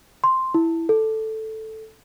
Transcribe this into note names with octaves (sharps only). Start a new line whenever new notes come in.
C6
E4
A4